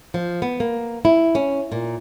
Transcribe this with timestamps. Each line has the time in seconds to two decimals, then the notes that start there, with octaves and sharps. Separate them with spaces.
0.14 F3
0.42 B3
0.60 A#3
1.05 E4
1.35 C#4
1.72 A#2